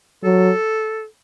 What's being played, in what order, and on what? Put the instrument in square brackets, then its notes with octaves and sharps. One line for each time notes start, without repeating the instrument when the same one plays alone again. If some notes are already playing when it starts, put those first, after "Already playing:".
[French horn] F#3 [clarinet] A4